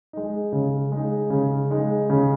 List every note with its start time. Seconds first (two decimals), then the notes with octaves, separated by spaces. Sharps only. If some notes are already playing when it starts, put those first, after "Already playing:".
0.13 G#3 D#4
0.52 C#3
0.92 G#3 D#4
1.30 C#3
1.70 G#3 D#4
2.10 C#3